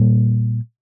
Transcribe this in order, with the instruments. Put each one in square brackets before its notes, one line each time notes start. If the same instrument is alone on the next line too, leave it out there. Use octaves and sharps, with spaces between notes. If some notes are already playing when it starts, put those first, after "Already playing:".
Already playing: [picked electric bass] A#2 G3 A#3